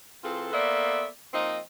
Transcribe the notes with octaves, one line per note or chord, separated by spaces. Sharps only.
E3 C4 F4 G#4 A4
A#3 B3 A4 C5 D5 E5
F3 A#3 C4 D#4